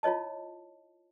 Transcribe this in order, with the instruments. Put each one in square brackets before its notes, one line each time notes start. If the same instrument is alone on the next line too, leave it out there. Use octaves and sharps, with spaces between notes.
[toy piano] E4 F4 C#5 D#5 A5